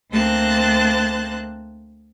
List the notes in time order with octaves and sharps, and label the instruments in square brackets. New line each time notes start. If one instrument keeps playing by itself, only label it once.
[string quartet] D2 A#3 C4 C5 A5 F#6